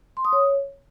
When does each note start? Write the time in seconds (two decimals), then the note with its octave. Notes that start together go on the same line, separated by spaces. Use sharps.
0.17 C6
0.25 D#6
0.33 C#5